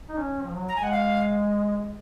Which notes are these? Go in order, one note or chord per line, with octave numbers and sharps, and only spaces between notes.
D#4
C#4
F3
F#3
A#5
G#5
G#3 F#5
F5